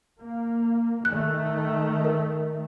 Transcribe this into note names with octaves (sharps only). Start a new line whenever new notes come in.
A#3
D#3 A3 F#6
A#4